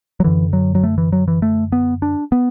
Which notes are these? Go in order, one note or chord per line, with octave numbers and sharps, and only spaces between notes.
F#3
F#2 D3 E3
F#3
F#3
A3
E3
F#3
E3
A3
B3
D4
B3